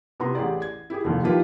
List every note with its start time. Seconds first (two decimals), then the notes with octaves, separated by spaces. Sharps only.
0.20 C3 B3 E4 A#5 C6
0.35 A1 G4 G#4 D5
0.62 G#6
0.90 E4 G4 G#4
1.05 F1 D#2
1.23 D#3 F3 E4 F4 G4 B4